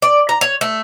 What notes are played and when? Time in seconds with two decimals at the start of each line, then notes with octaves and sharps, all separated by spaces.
0.02 D5
0.29 A#5
0.41 C#5
0.61 A3